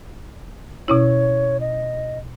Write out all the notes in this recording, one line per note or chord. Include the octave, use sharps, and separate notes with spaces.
B2 C#4 E4 C#5
D#5